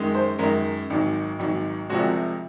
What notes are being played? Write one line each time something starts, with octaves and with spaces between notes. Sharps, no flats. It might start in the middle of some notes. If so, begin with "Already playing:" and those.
Already playing: F#2 D#3 G#3
C5
F#2 D#3 G#3 A#4
G#1 G#2 F#3
G#1 G#2 F#3
C2 C3 F3 G#3 F#4